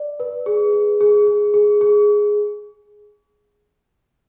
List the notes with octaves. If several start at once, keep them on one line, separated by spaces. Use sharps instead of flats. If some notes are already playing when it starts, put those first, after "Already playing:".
Already playing: D5
B4
G#4
G#4
G#4
G#4
G#4
G#4